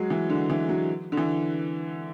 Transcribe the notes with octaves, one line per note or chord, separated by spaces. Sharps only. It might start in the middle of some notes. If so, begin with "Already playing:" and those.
Already playing: F#3 G#3
E3
D3
E3
F#3
D3
E3